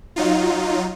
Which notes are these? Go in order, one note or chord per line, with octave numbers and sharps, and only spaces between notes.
F#3 D#4 F4